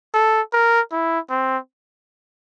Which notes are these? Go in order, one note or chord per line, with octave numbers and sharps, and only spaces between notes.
A4
A#4
E4
C4